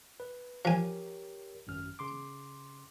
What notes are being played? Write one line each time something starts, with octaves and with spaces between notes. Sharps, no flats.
B4
F3 G4 A#4 C#5 G#5
G#1 F#2 F6
C#3 C6 D6